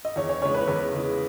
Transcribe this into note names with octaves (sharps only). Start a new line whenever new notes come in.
D#5
E2 C#5
C#5
C#3 G#3 C#5
B4
E2 B4
C#3 G#3